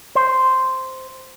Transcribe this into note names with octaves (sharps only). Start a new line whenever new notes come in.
C5